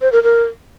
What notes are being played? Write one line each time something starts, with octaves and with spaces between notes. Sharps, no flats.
C5
A#4
A#4